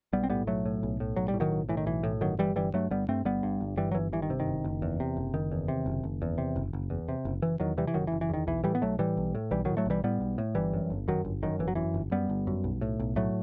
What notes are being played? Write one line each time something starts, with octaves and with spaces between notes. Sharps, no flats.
B1 G3 B3
C4
A2 G3 B3
B1 F#3 A3
A2
B1
A2
B1 F#3
G3
A2
D#3 F#3
B1
A2 E3
D#3
B1 E3
A2
G1 D#3 F#3
G2 E3 G3
G1 E3 G3
G2 F#3 A3
G1 G3 B3
G2 A3 C4
G1 G3 B3
G2
G1
G2 E3 G3
F#3
G1 E3
G2 E3
D#3
C3
D#3
F#1
F#1
E2
C3
F#1
F#1 D#3
E2
C3
F#1
F#1
E2
C3
F#1
F#1
E2
C3
F#1
F#1 E3
E2 D#3 F#3
C3 E3 G3
E3
F#1 D#3 F#3
E3
F#1
E3
E2 D#3
B1 E3
A2 E3 G3
B3
B1 F#3 A3
A2 E3 G3
B1
A2
B1 E3 G3
A2 D#3 F#3
F#3 A3
B1 E3 G3
A2 G3 B3
B1
A2
G1 E3 G3
F#2
G1
F#2 D#3 F#3
G1
F#2 D#3
G1 E3
F#3
F#2 E3
G1
F#2 G3 B3
G1
F#2
B1
A2
B1
A2 F#3 A3